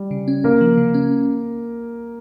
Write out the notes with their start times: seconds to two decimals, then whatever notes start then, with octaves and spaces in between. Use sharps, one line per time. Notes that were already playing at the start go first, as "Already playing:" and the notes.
Already playing: G3
0.11 C#3
0.28 C#4
0.44 C#3 A#3 A#4
0.61 F3
0.78 C#3
0.94 C#4